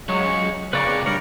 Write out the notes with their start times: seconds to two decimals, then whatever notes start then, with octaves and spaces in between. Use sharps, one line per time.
0.09 C#3 F#3 G#3 C#6
0.73 F2 C#3 A#3 B4 D5 C#6 D6
1.06 G3 D4 A#4 C#5